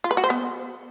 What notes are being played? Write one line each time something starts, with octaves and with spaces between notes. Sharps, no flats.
F4
B4
F#4
C5
B3